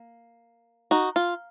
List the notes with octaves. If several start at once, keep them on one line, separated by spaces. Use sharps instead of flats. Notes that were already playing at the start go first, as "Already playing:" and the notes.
Already playing: A#3
D#4 F#4
F4